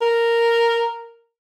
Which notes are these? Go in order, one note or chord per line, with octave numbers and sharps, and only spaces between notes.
A#4